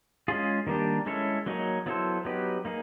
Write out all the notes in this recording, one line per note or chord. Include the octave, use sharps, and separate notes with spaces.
G#3 C#4 F4 G#4
D#3 G3 A#3 D4 G4
G#3 C#4 E4 A4 C#5
F#3 A#3 D#4 G#4 C#5
F#3 B3 E4 A4 C5
F#3 B3 D#4 G4 B4
A#3 D#4 G#4